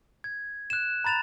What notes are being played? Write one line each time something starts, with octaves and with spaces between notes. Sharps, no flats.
G#6
F#6 E7
A#5 B5 A6 E7 F7